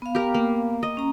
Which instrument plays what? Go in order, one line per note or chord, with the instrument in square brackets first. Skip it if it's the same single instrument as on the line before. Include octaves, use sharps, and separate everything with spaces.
[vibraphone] B3 F5
[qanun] G4 A#4
A#3
D#5
[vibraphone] C#4 A#5